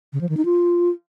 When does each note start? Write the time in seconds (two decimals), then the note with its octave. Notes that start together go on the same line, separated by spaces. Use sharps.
0.13 C#3
0.21 F3
0.29 D#3
0.37 D#4
0.45 F4